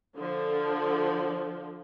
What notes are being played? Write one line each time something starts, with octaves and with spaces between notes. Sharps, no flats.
D3 F3